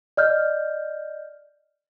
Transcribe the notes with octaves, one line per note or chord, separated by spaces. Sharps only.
D5 D#5 F6 G6